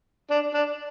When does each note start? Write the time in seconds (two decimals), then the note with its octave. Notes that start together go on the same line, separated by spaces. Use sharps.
0.30 D4
0.54 D4